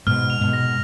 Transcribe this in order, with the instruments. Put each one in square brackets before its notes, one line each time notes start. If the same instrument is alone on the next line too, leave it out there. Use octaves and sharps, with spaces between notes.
[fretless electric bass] G#2 B2 [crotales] F6
[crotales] F7
[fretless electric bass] G#2 B2
[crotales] A#6